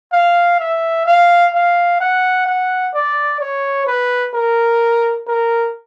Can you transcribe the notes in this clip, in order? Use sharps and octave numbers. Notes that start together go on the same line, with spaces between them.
F5
E5
F5
F5
F#5
F#5
D5
C#5
B4
A#4
A#4